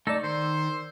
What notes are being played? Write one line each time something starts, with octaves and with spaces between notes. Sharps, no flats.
A3 D#4 A4 D5 E6
D#3 C5